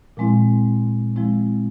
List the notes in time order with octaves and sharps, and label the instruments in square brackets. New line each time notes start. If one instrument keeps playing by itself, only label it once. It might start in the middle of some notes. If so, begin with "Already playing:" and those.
[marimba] A#2 F3 G#3 C4 E4
F3 G#3 C4 E4